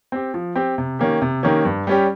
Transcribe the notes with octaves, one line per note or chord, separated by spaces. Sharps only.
C4 G4
F3
C4 G4
C3
D#3 A#3 C#4 G4
C3
D#3 A#3 C#4 G4
G2
G3 C#4 G4